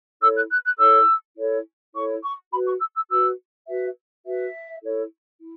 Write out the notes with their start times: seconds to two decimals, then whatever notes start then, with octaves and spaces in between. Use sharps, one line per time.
0.21 E4 A4 C#5 E6
0.36 F#6
0.51 F#6
0.65 F#6
0.78 E4 A4 C#5 E6
1.36 E4 A4 C#5
1.95 E4 A4 C#5 C#6
2.24 C#6
2.52 F#4 B4 B5
2.67 C#6
2.80 E6
2.95 E6
3.09 F#4 B4 E6
3.67 F#4 B4 E5
4.25 F#4 B4 E5
4.83 E4 A4 C#5
5.39 E4